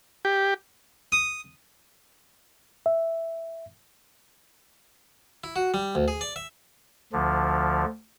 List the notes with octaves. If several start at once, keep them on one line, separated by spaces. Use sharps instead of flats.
G4
D#6
E5
E4
F#4
G3
D2
G#4
D5
E5
D2 D3 F3